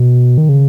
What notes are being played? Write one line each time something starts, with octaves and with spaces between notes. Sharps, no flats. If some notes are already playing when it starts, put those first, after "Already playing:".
Already playing: B2
D#3
C#3